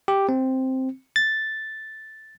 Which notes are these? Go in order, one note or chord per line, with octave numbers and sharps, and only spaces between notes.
G4
C4
A6